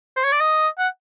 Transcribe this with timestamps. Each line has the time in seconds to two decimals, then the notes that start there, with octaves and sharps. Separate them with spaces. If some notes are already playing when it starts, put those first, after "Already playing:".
0.16 C5
0.24 C#5
0.32 D5
0.40 D#5
0.78 F#5